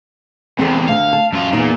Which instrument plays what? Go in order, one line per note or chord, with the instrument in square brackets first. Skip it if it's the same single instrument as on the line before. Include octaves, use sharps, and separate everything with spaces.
[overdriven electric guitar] E2 C3 [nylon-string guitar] C4 A4
[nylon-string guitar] D2 D3 [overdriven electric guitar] F5
[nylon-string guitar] A5
[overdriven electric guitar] F#2 F4
[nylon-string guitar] E2 G2 D#4 [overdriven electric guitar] A#2